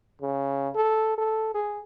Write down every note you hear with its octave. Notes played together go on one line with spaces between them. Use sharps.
C#3
A4
A4
G#4